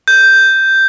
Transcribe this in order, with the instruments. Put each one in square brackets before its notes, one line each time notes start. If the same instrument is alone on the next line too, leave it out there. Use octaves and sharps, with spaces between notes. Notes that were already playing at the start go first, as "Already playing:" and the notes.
[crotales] G6